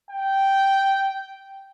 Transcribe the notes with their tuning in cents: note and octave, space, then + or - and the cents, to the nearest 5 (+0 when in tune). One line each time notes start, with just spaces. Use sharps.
G5 -5